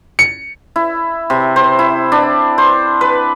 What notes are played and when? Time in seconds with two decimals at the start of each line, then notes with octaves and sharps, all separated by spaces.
0.19 C#7
0.76 E4
1.30 C3
1.56 C5
1.79 E4
2.12 D4
2.58 C5
3.01 B4